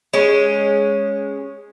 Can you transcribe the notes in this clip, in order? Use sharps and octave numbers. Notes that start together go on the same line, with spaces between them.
G#3 C#4